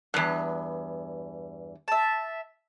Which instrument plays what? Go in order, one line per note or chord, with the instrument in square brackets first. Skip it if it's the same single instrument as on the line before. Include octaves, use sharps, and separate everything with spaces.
[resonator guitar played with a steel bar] E2 G2 [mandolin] F#6
[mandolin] E5 A5